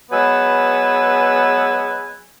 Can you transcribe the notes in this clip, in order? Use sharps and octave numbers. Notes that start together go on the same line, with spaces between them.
F#3 G#3 B3 B4 G#5 E6